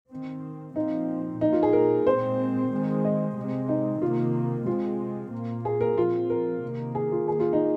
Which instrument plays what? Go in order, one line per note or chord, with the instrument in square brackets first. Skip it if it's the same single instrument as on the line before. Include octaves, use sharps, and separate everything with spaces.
[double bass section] D#3 C4
[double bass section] A#2 F3 C4 [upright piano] D#4
[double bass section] A#2 A#3 [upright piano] D#4
[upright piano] F4
G#4
A#4
[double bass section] A#2 G#3 C4 [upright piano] C5
[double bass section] D#3 G#3 C4
[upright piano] D#5
[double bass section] C3 G#3 C4
[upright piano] D#4
[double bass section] C3 D#3 A#3 [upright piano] F4
[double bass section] C3 G#3 C4 [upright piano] F4
[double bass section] A#2 A#3
[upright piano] G#4
A#4
[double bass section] A#2 F3 C4 [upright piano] F4
[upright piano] A#4
[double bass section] C3 D#3 A#3
[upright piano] G#4
F4
[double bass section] D#3 A#3 [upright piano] G#4
[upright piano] F4
D#4